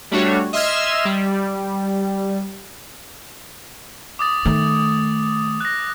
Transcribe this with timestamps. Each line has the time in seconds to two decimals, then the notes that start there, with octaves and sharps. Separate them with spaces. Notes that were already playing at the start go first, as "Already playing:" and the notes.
0.11 G3 A3 D4 F#4 C#5
0.53 D#5 E5 C6 E6 F6 G#6
1.05 G3
4.19 D6 D#6 A6
4.45 D#3 A3
5.61 F#6 A#6